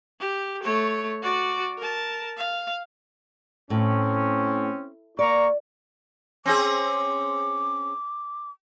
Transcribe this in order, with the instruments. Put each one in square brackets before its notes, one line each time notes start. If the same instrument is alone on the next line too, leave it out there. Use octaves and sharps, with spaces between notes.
[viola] G4
A3 C#5
F#4 D5
A#4 A5
F5
[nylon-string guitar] A2 [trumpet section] C4 C#4
[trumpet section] A#3 A#5 C#6 [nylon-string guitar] D5
[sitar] C4 C#4 G#4 [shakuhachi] D6